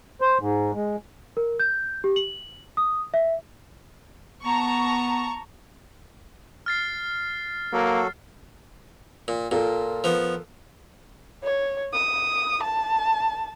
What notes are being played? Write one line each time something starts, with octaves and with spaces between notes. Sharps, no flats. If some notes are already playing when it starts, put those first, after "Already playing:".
C5
G#2
G#3
A#4
G6
G4
F#7
D#6
E5
B3 A5 A#5 C#6
F6 A6 C7
F#3 A#3 F#4 A4
A#2
A#2 F4 A4 A#4
F3 B3
C#5
D#6
A5